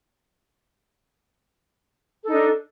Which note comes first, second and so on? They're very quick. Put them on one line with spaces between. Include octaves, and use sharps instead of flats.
A4 D#4 D4